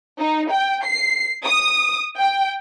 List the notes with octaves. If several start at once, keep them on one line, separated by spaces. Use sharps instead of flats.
D#4
G5
C7
D#6
G5